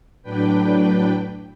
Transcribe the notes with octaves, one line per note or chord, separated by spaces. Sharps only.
A2 F#3 D4 B4 G5